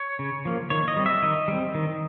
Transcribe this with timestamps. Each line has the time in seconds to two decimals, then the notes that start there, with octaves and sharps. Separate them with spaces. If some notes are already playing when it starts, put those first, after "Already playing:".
Already playing: C#5
0.19 C#3
0.45 F3 A#3
0.70 D#3 C#5
0.88 D#5
0.96 G3 C4
1.06 E5
1.22 D#3 D#5
1.48 G3 C4
1.75 D#3